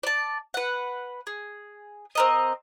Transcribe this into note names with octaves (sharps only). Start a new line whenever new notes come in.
D5 A5
B4 F#5
G#4
C4 A#4 D#5